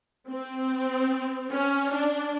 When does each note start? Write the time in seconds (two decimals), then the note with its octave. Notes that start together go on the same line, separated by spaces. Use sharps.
0.28 C4
1.50 C#4
1.92 D4